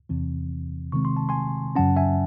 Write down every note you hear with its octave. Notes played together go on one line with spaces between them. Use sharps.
E2 C3 E3 C4
C3 D#3 G#3 C4 C#6
C6
A5
G#5 C6
F#2 C#3 F#3 C#4 F#5 A5
E5 G#5